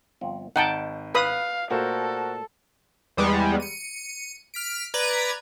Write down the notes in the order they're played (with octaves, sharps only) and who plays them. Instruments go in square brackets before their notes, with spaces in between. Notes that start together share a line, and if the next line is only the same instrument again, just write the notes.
[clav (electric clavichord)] G1 F3 C4
[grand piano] G#1 [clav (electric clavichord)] D#4 [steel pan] F#5 G5 A5
[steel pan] B4 B5 D#6 [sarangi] F5
[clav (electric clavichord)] A#2 A3 [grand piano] F#4 A#4 C5 [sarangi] A4
[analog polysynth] E2 G3 G#3 B3
C#7 D#7
F6 B6 D7
B4 D5 A#5 G#6